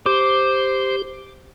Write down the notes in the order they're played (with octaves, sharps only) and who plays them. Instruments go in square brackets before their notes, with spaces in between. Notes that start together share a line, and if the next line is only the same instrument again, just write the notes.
[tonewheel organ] G4 [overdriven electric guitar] C5 [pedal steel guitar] D6